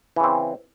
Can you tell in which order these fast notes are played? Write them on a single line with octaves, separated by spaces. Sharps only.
E3 C#3 C4